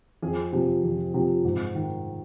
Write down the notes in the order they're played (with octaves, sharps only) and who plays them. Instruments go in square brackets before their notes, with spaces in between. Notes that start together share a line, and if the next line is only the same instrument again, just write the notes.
[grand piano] F2 G#4
C3 F3
F2
C3 F3
G#2
D#3